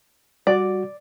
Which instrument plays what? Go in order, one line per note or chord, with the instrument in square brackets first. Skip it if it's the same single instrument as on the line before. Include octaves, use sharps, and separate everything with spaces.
[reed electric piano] G3 F#4 [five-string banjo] D5